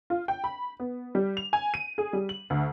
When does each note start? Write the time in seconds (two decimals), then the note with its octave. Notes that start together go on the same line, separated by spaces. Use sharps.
0.10 F4
0.28 G5
0.44 B5
0.80 B3
1.15 G3
1.37 F7
1.53 G#5
1.74 D#7
1.98 G#4
2.13 G3
2.29 F#7
2.50 D2